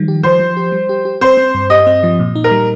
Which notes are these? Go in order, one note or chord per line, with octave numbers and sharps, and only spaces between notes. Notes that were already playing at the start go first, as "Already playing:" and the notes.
Already playing: D#3 F3 G3
G4
F3 C5
F3
G4
G3
G4
G4
C4 C5
C4
G2
G4 D#5
C4
F3
A#2
D#4
A#4
G3